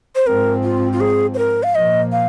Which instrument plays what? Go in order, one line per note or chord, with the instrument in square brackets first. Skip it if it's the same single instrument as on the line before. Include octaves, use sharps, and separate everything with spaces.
[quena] C5
[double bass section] G#2 F3 C4 [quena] A#4
[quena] F4
F4
G#4
C5
A#4
F5
[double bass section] A#2 F3 A#3 [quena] D#5
[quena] F5